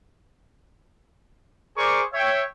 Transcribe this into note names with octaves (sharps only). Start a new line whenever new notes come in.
G#4 A#4 C5 D5 C#6 D6
C#5 E5 G5